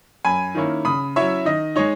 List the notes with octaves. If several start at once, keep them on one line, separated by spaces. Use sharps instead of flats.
F#2 G#5 B5
D#3 A#3 C#4 E4
C#3 B5 D#6
F#3 C#4 E4 C#5 E5
D#3 D#5
G#3 D#4 C#5